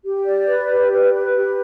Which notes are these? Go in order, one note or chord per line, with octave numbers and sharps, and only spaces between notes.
G4
D5
B4
G4
B4
B4
G4